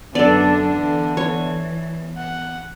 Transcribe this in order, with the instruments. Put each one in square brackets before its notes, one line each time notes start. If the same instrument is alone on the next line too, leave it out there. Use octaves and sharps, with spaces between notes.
[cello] F#2 D4 [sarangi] D3 [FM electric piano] B3 [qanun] A4 D5
[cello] E3
[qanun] C#5
[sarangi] F#5